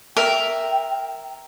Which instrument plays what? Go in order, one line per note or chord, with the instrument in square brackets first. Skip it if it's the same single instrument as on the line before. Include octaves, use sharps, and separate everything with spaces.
[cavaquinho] A#4 E5 [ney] G5